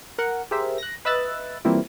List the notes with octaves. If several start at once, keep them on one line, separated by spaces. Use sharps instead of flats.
A#4 F#5
G4 G#4 A#4 C5 E5
F#6 A#6
B4 D#5 E5 E6 F#6 A6
E3 G3 A#3 C4 E4 F4